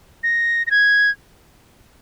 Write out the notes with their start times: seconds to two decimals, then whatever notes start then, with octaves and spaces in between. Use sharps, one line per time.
0.23 A#6
0.67 A#6
0.71 G#6